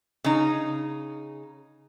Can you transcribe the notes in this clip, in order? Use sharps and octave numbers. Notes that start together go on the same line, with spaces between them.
C#3 D#4